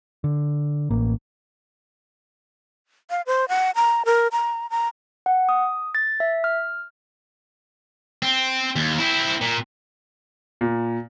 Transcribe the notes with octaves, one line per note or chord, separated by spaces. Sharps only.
D3
A1 A#3
F5
C5
F#5
A#5
A#4
A#5
A#5
F#5
D#6
A6
E5
F6
C4
D#2
C4 E4
A#2
A#2